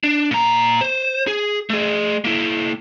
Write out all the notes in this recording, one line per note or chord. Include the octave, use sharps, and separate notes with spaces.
D4
A#2 A#5
C5
G#4
A3 G#4
A#3 E4